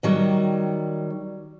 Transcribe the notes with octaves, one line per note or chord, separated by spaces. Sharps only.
D#3 F#3 G3